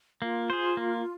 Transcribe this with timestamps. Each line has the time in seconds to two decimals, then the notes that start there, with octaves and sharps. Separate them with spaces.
0.22 A#3 F4
0.50 G#4 C5
0.77 A#3